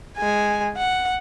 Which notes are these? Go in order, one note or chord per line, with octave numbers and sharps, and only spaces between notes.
G#3 G#5
F#5